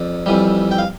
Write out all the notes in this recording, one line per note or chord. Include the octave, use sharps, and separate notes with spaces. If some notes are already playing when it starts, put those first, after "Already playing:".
Already playing: F2 D5
F2 E3 G3
G5
F5